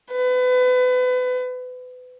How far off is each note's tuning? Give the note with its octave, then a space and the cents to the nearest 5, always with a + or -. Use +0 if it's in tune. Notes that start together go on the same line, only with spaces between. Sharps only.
B4 +30